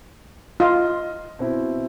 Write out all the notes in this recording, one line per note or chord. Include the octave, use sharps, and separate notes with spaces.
F4 D#5
B2 C4 E4